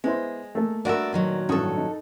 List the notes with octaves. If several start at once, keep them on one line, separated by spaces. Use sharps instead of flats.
G#3 B3 E4 C5
A3 A#3 A4
G2 F#4 A#4 D5 E5
A#2 D#3 F#3
A1 G2 F#4 A4 D#6
D#4